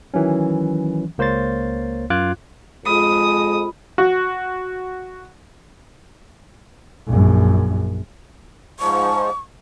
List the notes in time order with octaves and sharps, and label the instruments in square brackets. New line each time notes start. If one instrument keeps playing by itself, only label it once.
[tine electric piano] D#3 E3 F#3 C#4
C#2 A#3 C5 C#5 C6 A6
F#2 F4 D6 F#6 G#6
[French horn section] F2 G#3 [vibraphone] F4 B5 [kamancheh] D#6
[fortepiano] F#4
[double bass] A#1 F#2
[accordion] G#2 F3 [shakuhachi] C#6